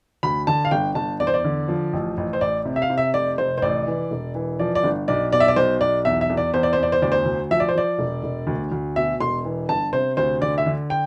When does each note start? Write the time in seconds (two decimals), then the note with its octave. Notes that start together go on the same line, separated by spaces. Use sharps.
0.23 D2 B5
0.47 D3 A5
0.65 F5
0.71 G1 G5
0.95 G1 A5
1.20 E2 D5
1.27 C5
1.34 D5
1.44 D3
1.68 F3
1.93 A1
2.17 A1
2.33 C5
2.41 A1 D5
2.65 C3
2.76 E5
2.82 F5
2.90 C3
2.98 E5
3.14 F1 D5
3.38 F1 C5
3.58 C5
3.62 A1 D5
3.87 E3
4.11 E1
4.35 E3
4.59 F3 D5
4.75 D5
4.84 G1
5.08 B1 D5
5.32 B2 D5
5.40 E5
5.48 D5
5.56 B1 C5
5.81 B1 D5
6.05 E2 E5
6.21 E5
6.30 E2
6.37 D5
6.53 E2 C5
6.63 D5
6.73 C5
6.78 E2 D5
6.92 C5
7.02 D2 D5
7.12 C5
7.26 D2
7.51 F3 E5
7.60 D5
7.69 C5
7.75 F3 D5
7.99 E1
8.23 E1
8.47 D2
8.72 D2
8.96 B2 E5
9.20 E1 C6
9.45 E3
9.69 G1 A5
9.93 C3 C5
10.17 D2 C5
10.41 D3 D5
10.58 E5
10.66 D3
10.90 G5